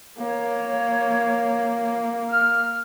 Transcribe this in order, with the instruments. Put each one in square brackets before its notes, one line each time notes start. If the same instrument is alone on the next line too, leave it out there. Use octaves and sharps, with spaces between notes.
[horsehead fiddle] A#3 [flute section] C#5
[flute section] F6